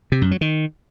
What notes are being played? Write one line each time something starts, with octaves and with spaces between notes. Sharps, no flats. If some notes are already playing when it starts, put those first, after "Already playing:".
C3
F#2
F#3
D#3